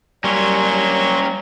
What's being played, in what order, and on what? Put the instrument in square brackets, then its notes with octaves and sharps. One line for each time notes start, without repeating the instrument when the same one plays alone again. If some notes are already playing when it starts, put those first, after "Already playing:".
[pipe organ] F#3 C6 C#6 [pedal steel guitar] G3 [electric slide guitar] A#3 C#4